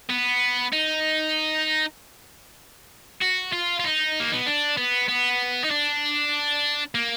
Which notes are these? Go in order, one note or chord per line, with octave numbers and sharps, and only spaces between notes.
B3
D#4
F#4
F4
F4
D#4
A#3
B3
D4
B3
B3
D#4
D4
A#3